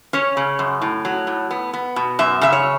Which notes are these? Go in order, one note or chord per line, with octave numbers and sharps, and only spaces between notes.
C#4 C#5
C#3
F#2
A2
F#3
A2
B3
B3
B2
F#2 E5
C#3 E5
C#5